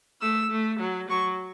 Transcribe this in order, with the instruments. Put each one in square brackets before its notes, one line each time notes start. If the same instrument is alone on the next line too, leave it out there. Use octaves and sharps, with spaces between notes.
[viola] A3 [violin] E6
[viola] A3
F#3
[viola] F#3 [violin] C#6